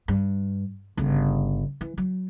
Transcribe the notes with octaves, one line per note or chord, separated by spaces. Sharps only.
G2
G1 C#3
E3
F#3